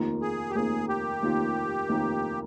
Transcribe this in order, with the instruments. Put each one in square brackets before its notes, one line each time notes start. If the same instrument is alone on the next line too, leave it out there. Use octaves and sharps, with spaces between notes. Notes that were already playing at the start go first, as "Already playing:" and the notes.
Already playing: [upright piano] F1 D#2 D#3 A#3 F4
[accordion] G#4
G4
[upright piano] F1 D#2 D#3 A#3 F4 [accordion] G#4
[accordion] G4
[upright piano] F1 D#2 D#3 A#3 F4
F1 D#2 D#3 A#3 F4